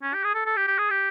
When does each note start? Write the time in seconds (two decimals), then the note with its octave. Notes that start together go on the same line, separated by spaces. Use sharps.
0.03 C#4
0.14 G4
0.24 G#4
0.35 A4
0.46 A4
0.57 G4
0.67 G4
0.79 G#4
0.90 G4